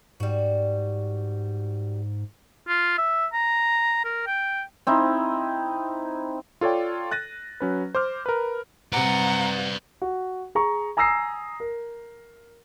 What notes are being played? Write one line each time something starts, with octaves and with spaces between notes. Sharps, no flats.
G#2 G3 F#4
F4
E5
A#5
A#4
G5
C4 D#4 E4
F4 A4 C#5 D5 G5
F#6 A6 A#6 D#7
F#3 C#4 B4
C5 D6 F6
A#4 B4
C3 G3 B4 D5 F#5 A#5
F#4
G#4 A#5 C#6
G#5 A#5 D#6 E6 A#6 C7
A#4